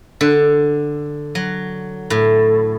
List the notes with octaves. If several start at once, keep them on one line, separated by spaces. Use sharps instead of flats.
D3
F#3
A2